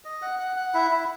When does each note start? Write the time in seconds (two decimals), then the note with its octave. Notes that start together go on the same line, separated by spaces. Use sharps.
0.05 D#5
0.22 F#5
0.39 F#5
0.56 F#5
0.74 E4
0.91 E4